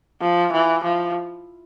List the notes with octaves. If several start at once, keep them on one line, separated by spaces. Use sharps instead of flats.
F3
E3
F3